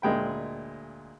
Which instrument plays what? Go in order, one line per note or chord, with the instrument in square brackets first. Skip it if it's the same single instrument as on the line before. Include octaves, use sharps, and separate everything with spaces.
[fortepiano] D2 A#2 G#3 G5 B5